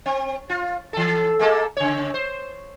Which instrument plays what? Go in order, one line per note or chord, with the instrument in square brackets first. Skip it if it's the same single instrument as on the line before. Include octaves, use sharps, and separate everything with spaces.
[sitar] C4
F4
E3 A4
G#3 A#3 A4
C#3 C#5
C5